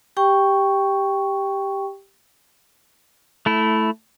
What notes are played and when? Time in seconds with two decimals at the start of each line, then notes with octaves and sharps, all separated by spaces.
0.17 G4 G5 C#6
3.46 A3 E4